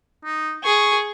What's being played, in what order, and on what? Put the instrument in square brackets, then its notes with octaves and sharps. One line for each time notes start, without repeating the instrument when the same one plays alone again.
[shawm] D#4
[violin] G#4 [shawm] C#6